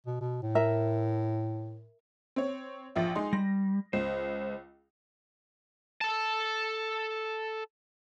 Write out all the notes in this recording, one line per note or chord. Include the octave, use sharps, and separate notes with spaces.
B2
B2
A2
A#4 E5
C4 C#5
A#1 F3 E5
G#3 D#4 C6
G3 A#6
C#2 C5
A4 A5